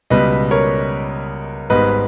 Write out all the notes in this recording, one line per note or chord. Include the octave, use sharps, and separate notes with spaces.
C#2 B2 G3 B4 D#5
A#4 C#5
G#1 G#2 G3 B3 B4 D#5